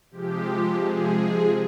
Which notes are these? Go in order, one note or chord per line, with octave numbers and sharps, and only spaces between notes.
C3 F3 G#3 G4
G#4